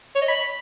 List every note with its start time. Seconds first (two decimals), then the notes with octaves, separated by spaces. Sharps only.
0.15 C#5
0.22 D#5
0.28 B5